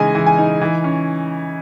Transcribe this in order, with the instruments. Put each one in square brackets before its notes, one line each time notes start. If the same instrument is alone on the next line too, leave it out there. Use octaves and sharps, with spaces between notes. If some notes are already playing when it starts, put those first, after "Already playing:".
Already playing: [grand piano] C#3 E3 G#3 D#4 D#5 G#5
E3
G#5
D#4
E3
C#4